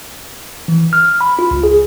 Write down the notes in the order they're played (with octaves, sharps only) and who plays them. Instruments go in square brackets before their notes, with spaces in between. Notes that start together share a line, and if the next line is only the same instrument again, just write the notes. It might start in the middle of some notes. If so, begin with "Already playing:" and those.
[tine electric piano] E3
F6
B5
F4
C#2
G#4